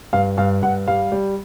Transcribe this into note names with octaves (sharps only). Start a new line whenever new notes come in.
G2 F5
G2 F5
G2 F#5
G3 F5
G3